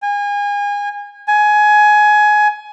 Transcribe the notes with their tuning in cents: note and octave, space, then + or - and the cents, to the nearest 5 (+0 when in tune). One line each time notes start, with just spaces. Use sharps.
G#5 -30
G#5 +20